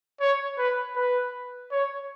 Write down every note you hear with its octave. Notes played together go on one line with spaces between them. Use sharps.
C#5
B4
B4
C#5